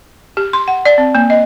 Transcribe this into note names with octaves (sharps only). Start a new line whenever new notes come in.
G4
C6
F#5
D5
C4
A#3
D#5